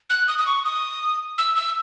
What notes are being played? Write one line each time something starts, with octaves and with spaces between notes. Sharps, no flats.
F#6
D#6
D#6
C#6
D#6
E6
E6